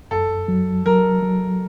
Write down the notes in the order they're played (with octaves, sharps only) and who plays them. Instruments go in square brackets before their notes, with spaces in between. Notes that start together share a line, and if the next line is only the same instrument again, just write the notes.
[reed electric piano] F#2 [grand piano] A4
[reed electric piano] F#3
[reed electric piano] F#3 [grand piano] A#4
[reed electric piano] F#3